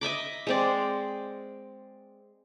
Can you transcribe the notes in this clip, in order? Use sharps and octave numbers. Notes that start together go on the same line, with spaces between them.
D#5 E5 B5 D6
G#3 C4 D5